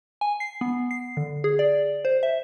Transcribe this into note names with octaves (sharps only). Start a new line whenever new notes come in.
G#5
C7
B3
C7
D3
G#4
D5
C5
E5